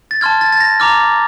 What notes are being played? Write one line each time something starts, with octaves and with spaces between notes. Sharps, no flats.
A6
A5 C6 F6 G#6
A6
A6
A#6
A#5 D6 F6